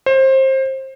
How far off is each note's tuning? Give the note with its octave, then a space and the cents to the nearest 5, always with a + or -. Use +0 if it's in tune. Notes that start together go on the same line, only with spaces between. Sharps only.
C5 +25